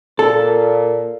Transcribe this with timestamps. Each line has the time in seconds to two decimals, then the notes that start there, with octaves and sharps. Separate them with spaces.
0.19 A#2 A4